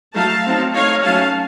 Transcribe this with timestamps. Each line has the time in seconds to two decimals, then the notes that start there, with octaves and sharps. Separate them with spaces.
0.15 F#3 A3 D#4 F5 A5
0.45 F#3 C4 D#4
0.74 A3 D#4 C#5 F5
1.04 F#3 A3 C#4 F5 A5